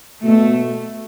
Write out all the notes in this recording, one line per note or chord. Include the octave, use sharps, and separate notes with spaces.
B2 A3